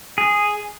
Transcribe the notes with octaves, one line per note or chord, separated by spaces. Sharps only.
G#4